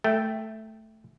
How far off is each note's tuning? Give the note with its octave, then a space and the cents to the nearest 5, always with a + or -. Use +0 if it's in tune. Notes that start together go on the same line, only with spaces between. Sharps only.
A3 +0 G5 +0